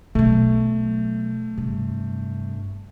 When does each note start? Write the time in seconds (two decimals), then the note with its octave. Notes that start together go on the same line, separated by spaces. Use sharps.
0.15 B2 F#3 A3
1.58 G2 C3